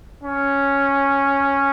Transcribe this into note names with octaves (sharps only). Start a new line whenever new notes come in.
C#4